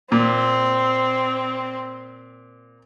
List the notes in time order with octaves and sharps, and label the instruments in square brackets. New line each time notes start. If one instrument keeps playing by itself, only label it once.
[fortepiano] A#2 [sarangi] C4